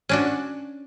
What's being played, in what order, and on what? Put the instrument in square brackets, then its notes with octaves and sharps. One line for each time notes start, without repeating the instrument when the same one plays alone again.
[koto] C#4 D4 F#4